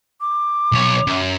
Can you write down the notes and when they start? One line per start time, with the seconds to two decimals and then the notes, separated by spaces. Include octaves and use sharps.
0.21 D6
0.72 B1 C#5
1.07 F#2